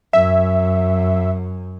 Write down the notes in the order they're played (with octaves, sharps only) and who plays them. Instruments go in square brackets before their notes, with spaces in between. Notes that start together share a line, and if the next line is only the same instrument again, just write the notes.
[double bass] F#2 [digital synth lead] E5